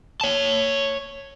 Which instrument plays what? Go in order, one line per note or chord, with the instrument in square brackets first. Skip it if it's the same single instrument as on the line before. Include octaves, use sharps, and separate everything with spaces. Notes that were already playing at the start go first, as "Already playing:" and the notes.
[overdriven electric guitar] C#5 A5